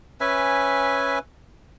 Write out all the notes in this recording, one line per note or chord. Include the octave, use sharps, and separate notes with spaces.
C#4 B4 E5 G#5